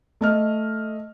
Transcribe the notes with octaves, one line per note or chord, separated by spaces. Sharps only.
A3 D#5 F6